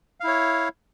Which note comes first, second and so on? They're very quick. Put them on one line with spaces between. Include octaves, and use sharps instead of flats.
F5 E4 C#5